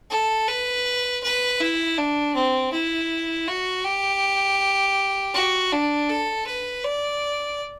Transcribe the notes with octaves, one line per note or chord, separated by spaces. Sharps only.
A4
B4
B4
E4
D4
C4
E4
F#4
G4
F#4
D4
A4
B4
D5